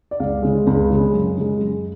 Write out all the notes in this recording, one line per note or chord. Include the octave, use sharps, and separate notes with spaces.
D5
C#2 F5
C#3 G#3
C#2
C#3 G#3
F#2
C#3 G#3
F#2